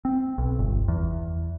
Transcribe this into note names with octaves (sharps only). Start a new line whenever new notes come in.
C4
B1
G1
E2